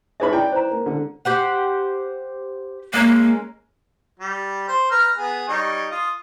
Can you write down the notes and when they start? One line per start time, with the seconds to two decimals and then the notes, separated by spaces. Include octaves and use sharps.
0.20 D#4 G#4 B4 C#5 E5 B5
0.33 E4 D5 G5
0.52 C5 A#5
0.71 A#3
0.86 D3
1.25 G4 C5 F#5
2.94 G#3 A#3 C#4 A#4
4.20 G3
4.68 C5
4.91 B4 A#5 F6
5.17 B3 G#4
5.49 G3 D#4 C#5
5.91 F4 D#6